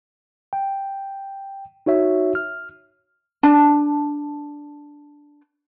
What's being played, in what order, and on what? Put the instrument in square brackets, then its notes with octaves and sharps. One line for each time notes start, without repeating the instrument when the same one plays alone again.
[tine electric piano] G5
D#4 F#4 C#5 E5
F6
[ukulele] D4 A5